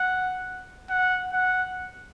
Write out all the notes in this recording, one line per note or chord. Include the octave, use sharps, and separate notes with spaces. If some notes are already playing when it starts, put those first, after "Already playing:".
Already playing: F#5
F#5
F#5